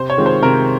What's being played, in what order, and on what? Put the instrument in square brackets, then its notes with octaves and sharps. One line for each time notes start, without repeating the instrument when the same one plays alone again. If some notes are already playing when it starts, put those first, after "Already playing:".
Already playing: [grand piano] C3 [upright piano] C5
[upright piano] C#5
[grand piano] D#3 G#3 C4 F4
[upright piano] C5
[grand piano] C3 [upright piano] A#4